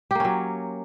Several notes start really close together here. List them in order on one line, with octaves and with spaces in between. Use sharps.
G4 A#3 C#4 F#3